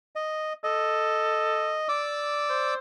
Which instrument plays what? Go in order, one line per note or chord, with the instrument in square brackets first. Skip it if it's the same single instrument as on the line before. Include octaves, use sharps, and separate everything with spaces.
[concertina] D#5
[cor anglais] A4 [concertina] D#5
[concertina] D5 D6 E6
[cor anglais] C5